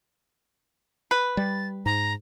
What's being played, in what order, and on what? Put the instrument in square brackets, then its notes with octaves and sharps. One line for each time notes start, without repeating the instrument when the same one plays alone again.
[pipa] B4
[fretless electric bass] G3 [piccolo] A6
[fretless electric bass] G#2 [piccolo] A#5